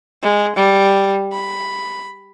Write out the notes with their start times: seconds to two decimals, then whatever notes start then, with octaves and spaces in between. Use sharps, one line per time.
0.23 G#3
0.56 G3
1.32 B5